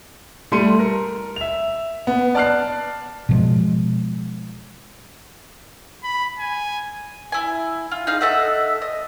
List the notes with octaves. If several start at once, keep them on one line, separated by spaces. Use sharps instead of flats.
G3 A3 C6 C#7 D#7
A#4
E5 F7
B3
D5 A5 F6 F#6 C7
B2 F3 G#3
B5
G#5
E4 G#5
F4
D#4 G#4 F5
A4 D#5 E5 F#5
D#5